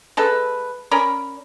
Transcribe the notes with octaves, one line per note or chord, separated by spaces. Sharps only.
G#3 A4 B4
C#4 A#4 D5 B5